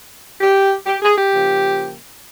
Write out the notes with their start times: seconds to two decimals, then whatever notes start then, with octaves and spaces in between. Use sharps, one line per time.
0.41 G4
0.86 G4
1.02 G#4
1.17 G4
1.32 C#3 F3 A#3